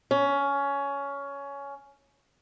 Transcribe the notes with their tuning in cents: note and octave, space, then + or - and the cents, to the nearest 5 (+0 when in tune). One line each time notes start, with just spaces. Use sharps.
C#4 +15